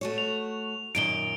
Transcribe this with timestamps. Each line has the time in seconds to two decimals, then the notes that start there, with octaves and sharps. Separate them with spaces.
0.01 A3 F#4 C#5
0.18 F7
0.95 F#2 A#2 D#3 D7 G7